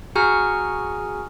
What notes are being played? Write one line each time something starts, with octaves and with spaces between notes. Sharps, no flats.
F#4 G#4 G#5 A#5 C#6 F6